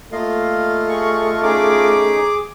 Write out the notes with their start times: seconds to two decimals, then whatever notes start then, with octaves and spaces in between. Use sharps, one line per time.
0.12 A3 A#3 F4 D#5 F5
0.88 G#4 C#6
1.42 C#4 D#4 G#4 D6